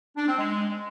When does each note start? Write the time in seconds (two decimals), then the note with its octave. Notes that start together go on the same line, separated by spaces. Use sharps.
0.17 D4
0.28 C4
0.38 G#3